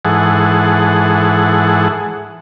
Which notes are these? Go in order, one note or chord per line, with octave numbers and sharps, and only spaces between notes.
G#2 E3 G#4 A4 F#5